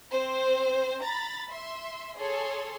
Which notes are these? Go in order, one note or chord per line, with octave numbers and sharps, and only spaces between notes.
C4 C5
A#5 B5 A6
E5 C6
G#4 A4 C#5 C6